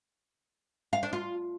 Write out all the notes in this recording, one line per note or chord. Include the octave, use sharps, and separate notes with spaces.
F5
D4
F4